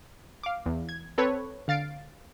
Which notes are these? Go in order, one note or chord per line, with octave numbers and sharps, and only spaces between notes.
F5 D6
E2
G#6
C4 A4 B4 C#5
D3 F5 A6 C7 D7